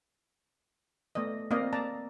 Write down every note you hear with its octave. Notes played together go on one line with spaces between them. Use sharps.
A3 B3 D5 D#5
A#3 C4 D5 D#5 F5
D5 A5 A#5